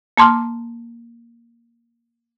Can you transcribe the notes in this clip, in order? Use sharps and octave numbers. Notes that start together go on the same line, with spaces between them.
A#3 A5 C6 D6 F6